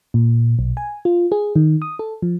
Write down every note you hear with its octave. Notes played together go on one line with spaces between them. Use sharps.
A#2
B1
G#5
F4
G#4
D#3
D#6
A4
F3